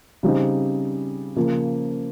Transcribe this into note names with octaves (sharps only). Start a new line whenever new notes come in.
C#3 G3 C4 D#4
C#3 F3 A#3